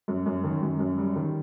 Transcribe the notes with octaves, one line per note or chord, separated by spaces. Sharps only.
F#2
F#2
D#3
F#2
F#2
G3
D#3